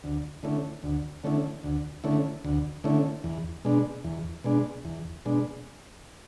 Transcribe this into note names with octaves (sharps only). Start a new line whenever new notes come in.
D2
D3 A3 C#4 E4
D2
D3 A3 C#4 E4
D2
D3 A3 C#4 E4
D2
D3 A3 C#4 E4
E2
B2 G#3 D4
E2
B2 G#3 D4
E2
B2 G#3 D4